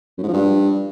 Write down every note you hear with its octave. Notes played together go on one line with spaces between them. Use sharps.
F#2
G#2
F3
G2